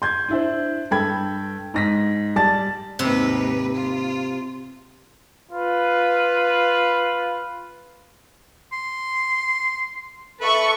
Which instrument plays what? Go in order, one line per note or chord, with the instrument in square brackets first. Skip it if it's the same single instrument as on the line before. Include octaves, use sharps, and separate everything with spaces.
[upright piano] C6 G6 G#6
D4 E4 C5
G2 A4 G5 B5 G#6
G#2 A#6 B6
G3 D5 A5 A6
[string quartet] D#2 G#2 B4 [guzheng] C3
[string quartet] F4
[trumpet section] F4 B4
[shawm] C6
[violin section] A4 E5 C#6 [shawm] B4